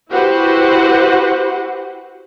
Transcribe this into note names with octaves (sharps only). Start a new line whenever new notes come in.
E4 F#4 G4 B4 C5 F#5